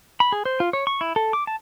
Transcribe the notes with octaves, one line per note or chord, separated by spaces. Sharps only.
B5
G#4
C5
F4
C#5
C#6
E4
A4
D6
A5